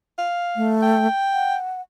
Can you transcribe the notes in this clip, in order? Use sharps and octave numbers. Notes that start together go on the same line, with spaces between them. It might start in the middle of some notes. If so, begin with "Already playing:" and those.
F5
A3
G5
F#5